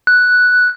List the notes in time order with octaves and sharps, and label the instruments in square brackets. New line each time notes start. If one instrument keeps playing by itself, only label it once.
[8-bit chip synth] F#6